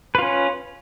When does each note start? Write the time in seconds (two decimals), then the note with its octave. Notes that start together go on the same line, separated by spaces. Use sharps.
0.15 B4
0.18 F4
0.22 C#4